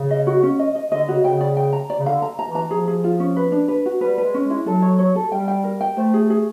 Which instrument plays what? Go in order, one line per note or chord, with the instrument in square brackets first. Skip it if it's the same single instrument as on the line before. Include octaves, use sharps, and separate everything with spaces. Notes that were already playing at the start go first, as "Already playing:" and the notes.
Already playing: [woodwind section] C#3
[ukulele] D#5
F#4
C#4
D#5
D#5
[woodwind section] D3 [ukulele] D#5
[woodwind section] C#3 [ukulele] F#4
[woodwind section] C#3 [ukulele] G5
[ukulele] D5
G5
A#5
D5
[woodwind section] C#3
[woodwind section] D3 [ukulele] F5
[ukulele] A#5
A#5
[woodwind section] E3
[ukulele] A#5
[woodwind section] F3 [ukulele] G#4
[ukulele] G#4
F4
C#4
B4
D4
B4
F#4
[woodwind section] G3 [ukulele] B4
[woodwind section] G#3 [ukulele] B4
[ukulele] C#4
[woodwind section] G#3
[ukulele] E4
[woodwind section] F#3 [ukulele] A4
[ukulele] C#5
C#5
A4
[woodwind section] G3 [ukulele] G5
[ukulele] G5
A#4
G5
[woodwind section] A3 [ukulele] C5
[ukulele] G#4
G#4